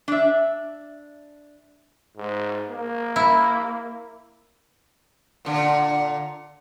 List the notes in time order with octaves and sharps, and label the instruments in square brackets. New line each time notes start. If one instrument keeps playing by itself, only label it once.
[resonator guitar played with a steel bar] D4 E5
[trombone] G#2
A#3
[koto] E4
[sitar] A#2 D3